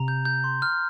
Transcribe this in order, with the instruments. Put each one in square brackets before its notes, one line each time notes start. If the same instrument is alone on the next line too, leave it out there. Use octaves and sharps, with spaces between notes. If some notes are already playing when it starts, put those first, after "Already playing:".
Already playing: [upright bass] C3 [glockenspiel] A#5
[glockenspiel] G6
G6
C6
F6